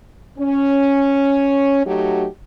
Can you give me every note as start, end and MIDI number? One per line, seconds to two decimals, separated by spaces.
0.38 1.81 61
1.85 2.26 54
1.85 2.26 57
1.85 2.26 63
1.85 2.26 66
1.85 2.26 67